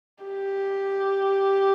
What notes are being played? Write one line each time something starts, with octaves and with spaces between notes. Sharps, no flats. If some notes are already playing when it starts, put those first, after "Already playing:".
G4